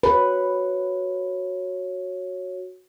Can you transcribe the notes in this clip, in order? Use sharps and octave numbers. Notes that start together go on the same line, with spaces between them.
F#4 B4 C#5